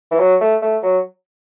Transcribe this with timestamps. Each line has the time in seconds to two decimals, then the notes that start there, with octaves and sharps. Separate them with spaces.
0.11 E3
0.20 F#3
0.41 A3
0.62 A3
0.83 F#3